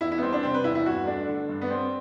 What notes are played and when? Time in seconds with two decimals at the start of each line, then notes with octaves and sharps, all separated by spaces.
0.01 E2 E4
0.12 E4
0.18 B3
0.22 G3 C4
0.32 D4
0.43 C3 C4
0.54 B4
0.64 E2 E4
0.75 E4
0.85 G2 F#4
1.06 A3 D4
1.28 D3
1.49 G2
1.61 B3
1.70 G3 C4